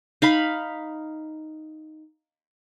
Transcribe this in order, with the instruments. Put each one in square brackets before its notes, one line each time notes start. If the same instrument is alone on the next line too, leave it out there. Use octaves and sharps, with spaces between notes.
[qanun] D#4 F5 B5